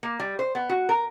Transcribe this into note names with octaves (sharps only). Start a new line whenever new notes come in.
A#3
G3
C5
B3
F#4
A#4